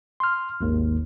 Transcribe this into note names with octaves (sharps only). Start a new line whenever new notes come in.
C6 F6
G#1 D#2